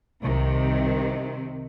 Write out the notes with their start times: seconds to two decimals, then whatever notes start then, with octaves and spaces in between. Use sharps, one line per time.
0.22 C2 C3 D#3